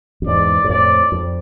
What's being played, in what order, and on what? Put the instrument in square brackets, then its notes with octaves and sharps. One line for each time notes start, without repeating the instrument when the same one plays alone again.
[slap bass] F2
[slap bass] E2 G#2 [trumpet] D5
[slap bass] G#2
[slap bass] F2 A2 [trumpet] D5
[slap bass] F2